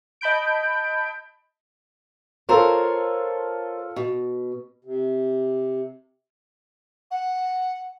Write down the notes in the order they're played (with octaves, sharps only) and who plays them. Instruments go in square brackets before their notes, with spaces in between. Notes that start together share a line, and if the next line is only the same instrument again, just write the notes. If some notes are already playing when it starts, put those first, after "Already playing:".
[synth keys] D#5 A5 B5 G6 D7
[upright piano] F4 A4 [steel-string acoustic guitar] A#4 C5 C#5
[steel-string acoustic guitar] B2
[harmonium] C3
[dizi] F#5